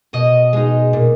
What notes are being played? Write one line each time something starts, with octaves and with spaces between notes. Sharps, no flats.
B2 D#5
G#3 D#4
A#2